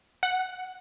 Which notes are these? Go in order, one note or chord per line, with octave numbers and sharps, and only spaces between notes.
F#5